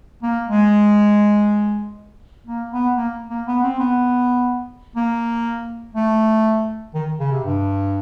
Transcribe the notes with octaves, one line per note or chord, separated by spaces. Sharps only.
A#3
G#3
A#3
B3
A#3
A#3
B3
C4
B3
A#3
A3
D#3
C#3
C3
G2